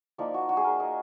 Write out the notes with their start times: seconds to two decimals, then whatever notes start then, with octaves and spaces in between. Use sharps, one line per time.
0.18 F3 A#3 D#4 D5
0.34 F#4
0.49 F#4
0.57 G#4
0.64 A#4
0.80 D#5